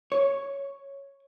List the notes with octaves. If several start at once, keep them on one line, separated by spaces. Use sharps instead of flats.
C#5